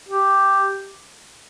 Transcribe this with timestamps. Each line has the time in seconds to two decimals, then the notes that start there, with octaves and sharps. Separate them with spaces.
0.08 G4